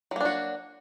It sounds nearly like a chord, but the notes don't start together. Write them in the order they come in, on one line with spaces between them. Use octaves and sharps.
F#3 A#3 D4 F#4